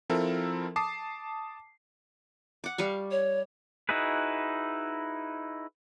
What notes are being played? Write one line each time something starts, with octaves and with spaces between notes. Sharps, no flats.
F3 C4 E4 A4 A#4
A5 D6 D#6 C7
F#5 D6
G3 F5 C#6
C#5
D#4 E4 F#4 G#4 B4